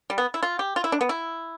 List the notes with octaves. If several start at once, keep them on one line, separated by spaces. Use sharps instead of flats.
G3
B3
E4
F4
G4
F4
E4
D4
B3
E4